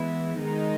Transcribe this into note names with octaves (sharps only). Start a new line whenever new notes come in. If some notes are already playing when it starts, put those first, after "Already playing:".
Already playing: E3 G#3 B3 E4
D#3 G#3 D#4